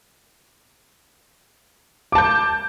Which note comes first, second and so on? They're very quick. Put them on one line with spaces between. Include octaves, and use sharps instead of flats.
D6 A5 G6